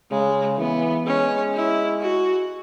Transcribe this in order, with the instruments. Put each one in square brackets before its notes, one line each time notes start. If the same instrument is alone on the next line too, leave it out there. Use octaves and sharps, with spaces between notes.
[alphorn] C#3 [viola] G#3
[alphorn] E3 [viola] B3
[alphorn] G#3 [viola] C#4
[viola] E4
F#4